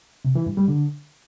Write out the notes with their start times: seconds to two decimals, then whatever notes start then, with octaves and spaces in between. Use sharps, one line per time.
0.25 C3
0.35 E3
0.46 G2
0.57 G3
0.68 D3